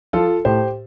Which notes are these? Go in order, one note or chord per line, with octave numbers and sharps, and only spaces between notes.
F3 F4 A4
A2 G4 C5